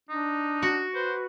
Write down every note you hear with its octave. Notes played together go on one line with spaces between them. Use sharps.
D4 D#4
F#4
B4 C5